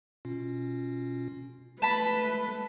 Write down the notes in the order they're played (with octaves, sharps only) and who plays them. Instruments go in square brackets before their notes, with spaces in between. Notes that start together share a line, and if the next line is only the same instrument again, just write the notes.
[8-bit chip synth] B2 C#4 F4
[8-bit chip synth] G#3 [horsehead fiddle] A3 B4 [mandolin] A5 B5